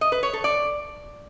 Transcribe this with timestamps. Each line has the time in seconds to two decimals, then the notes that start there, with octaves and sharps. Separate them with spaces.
0.01 D#5
0.12 B4
0.23 C#5
0.33 A4
0.44 D5